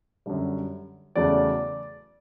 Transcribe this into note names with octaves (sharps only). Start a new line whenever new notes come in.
F#2 D3 G3
E2 C#3 F#3 A3 D5